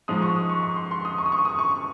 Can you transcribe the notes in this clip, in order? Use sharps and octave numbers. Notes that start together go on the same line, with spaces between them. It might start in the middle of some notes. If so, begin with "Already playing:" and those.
G#2 F3 G#3 D#6
C#6
D#6
C#6
C#6
C6
C6
D#6
C#6
D#6
C#6
D#6
C#6